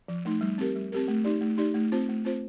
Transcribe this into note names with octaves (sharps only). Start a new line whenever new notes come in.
F3
A3 D#4
G3
C4 G4 A#4
G3
C4 G4 A#4
A3
D#4 G4 D5
A3
D#4 G4 D5
A3
C4 F4 C5
A3
C4 F4 C5